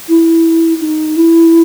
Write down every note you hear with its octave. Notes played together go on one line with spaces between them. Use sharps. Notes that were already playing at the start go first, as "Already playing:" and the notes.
E4
D#4
E4